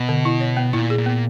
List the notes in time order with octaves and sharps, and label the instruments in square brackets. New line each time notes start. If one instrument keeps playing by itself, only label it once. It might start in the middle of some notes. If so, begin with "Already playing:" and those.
Already playing: [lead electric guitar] B2
[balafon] D3
E4
C#5
B3
[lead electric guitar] A#2 [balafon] E4
[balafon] G#4
[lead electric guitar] A#2
[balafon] B3